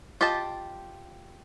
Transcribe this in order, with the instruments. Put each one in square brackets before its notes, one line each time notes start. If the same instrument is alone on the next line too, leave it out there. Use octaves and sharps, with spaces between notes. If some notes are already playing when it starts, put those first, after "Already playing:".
[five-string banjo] F4 G4 D#5 A5